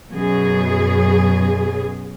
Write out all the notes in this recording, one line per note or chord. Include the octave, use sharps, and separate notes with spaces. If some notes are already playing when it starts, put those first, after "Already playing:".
F#2 B2 G#4